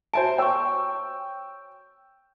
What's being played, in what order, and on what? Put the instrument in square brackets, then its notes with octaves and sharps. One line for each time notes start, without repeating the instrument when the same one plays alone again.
[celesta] F#4 E5 D7 [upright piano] C5 G#5 A5
[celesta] C#5 C#6 [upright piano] G5 E6